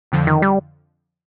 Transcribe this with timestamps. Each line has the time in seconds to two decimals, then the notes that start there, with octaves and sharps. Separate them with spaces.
0.12 F2 D3 F3
0.27 D#3
0.42 G3